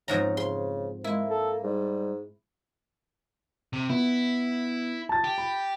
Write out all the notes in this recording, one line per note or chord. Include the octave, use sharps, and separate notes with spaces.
F2 G#2 C#4 A#5
C#3 C6
G#3 A#3 E4
A4
G#2 G3
C3
B3 E4
A5 A6
G4
B5